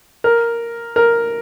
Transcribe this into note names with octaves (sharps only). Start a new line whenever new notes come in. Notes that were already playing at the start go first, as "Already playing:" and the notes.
A#4
A#4